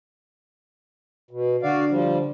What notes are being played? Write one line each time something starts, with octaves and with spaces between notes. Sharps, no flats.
B2
D3 F#4 D5 F5
F3 G3